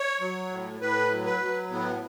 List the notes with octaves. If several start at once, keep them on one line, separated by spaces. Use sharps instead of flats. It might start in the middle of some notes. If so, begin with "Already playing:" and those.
Already playing: C#5
F#3
A2
A2 B4
F#3
B4
F#3
A2 B3